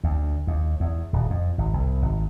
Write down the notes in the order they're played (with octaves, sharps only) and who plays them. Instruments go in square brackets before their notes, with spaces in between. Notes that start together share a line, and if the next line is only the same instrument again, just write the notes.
[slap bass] D2
D#2
E2
D#1
F2
G#1
C2
G#1